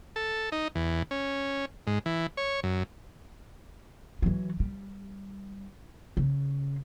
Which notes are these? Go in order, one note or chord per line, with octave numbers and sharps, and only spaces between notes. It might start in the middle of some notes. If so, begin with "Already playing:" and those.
A4
D#4
E2
C#4
G#2
E3
C#5
F#2
E3 F#3
G3
C#3